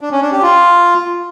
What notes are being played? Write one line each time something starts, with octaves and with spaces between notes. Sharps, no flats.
D4
C#4
D4
G4
F4